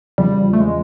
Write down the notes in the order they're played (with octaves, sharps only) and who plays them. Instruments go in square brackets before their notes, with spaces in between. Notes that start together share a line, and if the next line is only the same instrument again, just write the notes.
[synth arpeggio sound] E2 C#3 F3 [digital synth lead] G3
[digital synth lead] A3
G#3